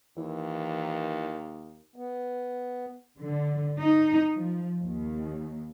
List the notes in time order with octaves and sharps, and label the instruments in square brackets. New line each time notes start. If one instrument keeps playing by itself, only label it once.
[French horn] D#2 [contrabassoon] E3
[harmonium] B3
[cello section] D3
D#4
F3
D#2